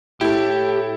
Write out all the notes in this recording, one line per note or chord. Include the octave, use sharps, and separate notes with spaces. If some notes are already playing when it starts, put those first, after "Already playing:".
A2 E4 G4 A4